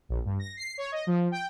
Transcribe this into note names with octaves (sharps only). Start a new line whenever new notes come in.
A#1
G2
A#6
C7
C#5
D#5
F3
G5